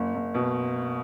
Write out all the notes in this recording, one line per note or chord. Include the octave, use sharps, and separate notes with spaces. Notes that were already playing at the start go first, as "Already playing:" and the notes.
Already playing: F#1
F#1
B2